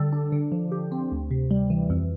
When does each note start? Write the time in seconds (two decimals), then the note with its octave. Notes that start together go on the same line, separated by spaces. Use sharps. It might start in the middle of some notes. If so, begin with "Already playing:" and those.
Already playing: D3 G3 A4
0.12 D4
0.32 D3
0.52 F3
0.72 G4
0.92 C4
1.12 D2
1.31 C3
1.51 G3
1.70 E3
1.90 F2